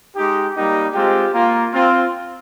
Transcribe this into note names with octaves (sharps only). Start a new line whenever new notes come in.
G#3 D#4 G4
G3 A#3 D#4 G4
G#3 C4 F4 G4
A#3 F4
C4 F4